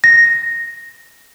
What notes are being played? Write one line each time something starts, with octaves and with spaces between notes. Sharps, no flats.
A#6